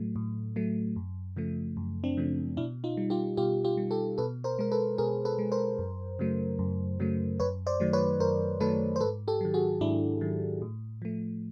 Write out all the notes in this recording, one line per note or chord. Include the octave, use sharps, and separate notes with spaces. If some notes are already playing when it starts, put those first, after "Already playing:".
Already playing: A2 F#3 A3
A2
F#3 A3
F#2
C#3 F3 A3
F#2
C4 D4
C#3 F3 A3
B2 D4 E4
D#4 F4
G3
F4 G4
B2 F4 G4
F4 G4
G3
G4 A4
B2 A4 B4
A#4 C5
G#3 A#4
A4 B4
B2 G#4 A#4
A4 B4
G#3
A#4 C5
F#2
C#3 F#3 A3
F#2
C#3 F#3 A3
F#2 B4 C#5
C5 D5
D#3 F#3 A3
B4 C#5
F#2 A#4 C5
D#3 F#3 A3 A4 B4
C5
G#2 A4 B4
G4 A4
D#3 F#3
F#4 G#4
G#2 D4 E4
D#3 F#3
A2
F3 A3